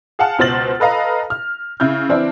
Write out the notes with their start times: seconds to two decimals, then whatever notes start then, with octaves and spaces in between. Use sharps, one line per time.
0.19 G#4 F5 F#5 A5 F6
0.39 C#2 B2 C5 F6 A6 F#7
0.80 A4 B4 D#5 F5 A#5
1.30 F6
1.80 C#3 E4 F6 G6
2.09 E3 C4 D4 E4